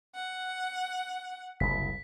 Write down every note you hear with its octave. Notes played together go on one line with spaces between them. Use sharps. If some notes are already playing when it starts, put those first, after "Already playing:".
F#5
F#1 C2 B6